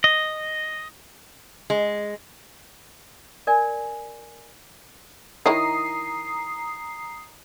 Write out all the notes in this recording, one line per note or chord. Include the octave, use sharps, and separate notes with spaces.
D#5
G#3
A#4 D5 G#5
D#3 E4 C#5 A#5 D#6 C7